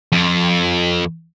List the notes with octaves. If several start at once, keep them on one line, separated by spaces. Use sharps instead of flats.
F2